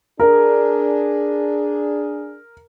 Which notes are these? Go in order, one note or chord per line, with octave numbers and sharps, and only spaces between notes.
D4 G#4 A#4